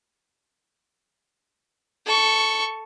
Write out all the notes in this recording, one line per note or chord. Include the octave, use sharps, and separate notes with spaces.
A4 C#6